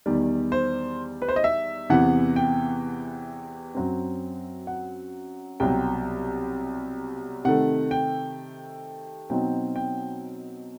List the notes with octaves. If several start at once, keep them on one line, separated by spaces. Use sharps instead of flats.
E2 D#3 G3
C5
B4
C5
D#5
E5
E2 C3 E3 B3 F#5
G5
F#2 F#3 C4
F#5
C2 B2 F#3 G5
C3 D#3 A3 F#5
G5
B2 F#3 C4 D#4 G5
G5